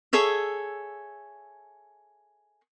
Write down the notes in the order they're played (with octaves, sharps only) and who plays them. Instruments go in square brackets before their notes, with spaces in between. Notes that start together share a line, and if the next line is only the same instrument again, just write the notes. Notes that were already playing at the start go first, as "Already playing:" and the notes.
[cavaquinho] G#4 A4 C#5 E5